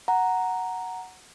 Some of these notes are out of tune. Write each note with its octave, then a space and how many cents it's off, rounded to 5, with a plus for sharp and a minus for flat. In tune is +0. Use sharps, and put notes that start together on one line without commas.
F#5 +0 A#5 +0